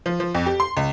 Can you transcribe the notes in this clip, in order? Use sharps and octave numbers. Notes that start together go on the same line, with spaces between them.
F3
F3
F2
G4
C6
C#2